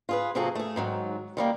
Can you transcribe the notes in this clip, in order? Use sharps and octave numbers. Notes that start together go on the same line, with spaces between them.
F4 G#4 B4
C3 F3 A#3 F#4 G#4 A4
A3 G#4
G#2 D#3 F#3
D#3 G3 A#3